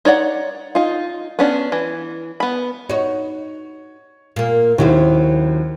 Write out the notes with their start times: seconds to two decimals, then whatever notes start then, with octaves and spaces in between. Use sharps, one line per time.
0.05 D#4 C#5 D5 F#5
0.75 D#4 F4
1.39 B3 C#4 D4
1.72 E3
2.40 B3 B5
2.89 D#4 F#4 C#5
4.36 A#2 A#3
4.78 D#2 F#3 C#4 E4 F#4 C5